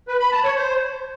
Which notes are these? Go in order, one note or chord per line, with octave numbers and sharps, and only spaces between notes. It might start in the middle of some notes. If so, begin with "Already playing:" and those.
B4
B5
A5
C#5
C5